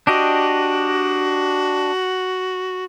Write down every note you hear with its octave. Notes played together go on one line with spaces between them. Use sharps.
D4 F#4 G4 D#5